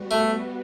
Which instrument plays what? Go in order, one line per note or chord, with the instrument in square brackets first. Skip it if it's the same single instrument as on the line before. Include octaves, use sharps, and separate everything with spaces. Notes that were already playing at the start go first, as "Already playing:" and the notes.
Already playing: [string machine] G3 B3 F#4
[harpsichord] A3